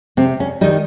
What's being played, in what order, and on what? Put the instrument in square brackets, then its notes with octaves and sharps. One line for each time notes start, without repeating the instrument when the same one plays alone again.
[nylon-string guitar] C3 C4
C#4
D#3 G3 D#4